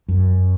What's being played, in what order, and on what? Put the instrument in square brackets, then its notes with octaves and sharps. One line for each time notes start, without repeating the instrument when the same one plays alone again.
[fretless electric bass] F#2